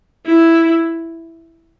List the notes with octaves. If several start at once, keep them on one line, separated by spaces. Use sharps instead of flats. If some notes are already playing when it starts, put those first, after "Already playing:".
E4